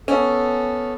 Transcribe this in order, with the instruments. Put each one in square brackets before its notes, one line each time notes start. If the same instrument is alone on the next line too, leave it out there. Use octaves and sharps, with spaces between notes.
[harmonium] B3 A4 [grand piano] C#4